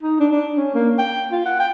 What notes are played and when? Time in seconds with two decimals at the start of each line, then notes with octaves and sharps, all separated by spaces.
0.03 D#4
0.20 D4
0.32 D4
0.56 C#4
0.74 A#3
0.98 G5
1.32 F4
1.46 F#5
1.60 G5